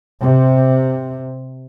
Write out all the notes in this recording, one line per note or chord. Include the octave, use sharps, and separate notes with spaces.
C3